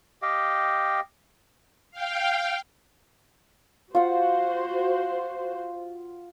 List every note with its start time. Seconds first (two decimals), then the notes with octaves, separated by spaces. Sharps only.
0.22 G4 D#5 F5 G5
1.91 F5 G5
3.95 F4 F#4 C5 F#5